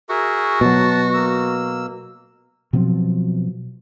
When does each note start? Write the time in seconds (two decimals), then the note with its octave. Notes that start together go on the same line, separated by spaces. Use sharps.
0.10 F#4 G#4 A#4 E5
0.61 B2 F#3 A5
1.14 A#3 E6
2.73 B2 F3 F#3 C4